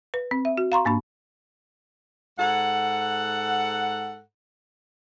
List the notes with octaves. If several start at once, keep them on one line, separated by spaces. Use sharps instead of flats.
B4
C4
E5
F#4
F5 A#5 C6 C#6
G#2 A#3 D4 B5
G#2 A4 F#5